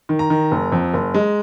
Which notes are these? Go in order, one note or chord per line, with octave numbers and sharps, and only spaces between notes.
D#3
A#5
D#3
F#1
F2
F#1
G#3